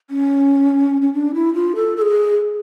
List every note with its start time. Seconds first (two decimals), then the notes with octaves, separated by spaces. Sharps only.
0.10 C#4
1.02 C#4
1.13 D4
1.34 E4
1.54 F4
1.76 A4
1.97 A4
2.02 G#4